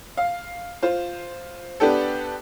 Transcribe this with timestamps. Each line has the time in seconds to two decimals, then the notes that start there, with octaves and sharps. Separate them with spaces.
0.17 F5
0.83 F4 C5
1.80 B3 D4 G4 A4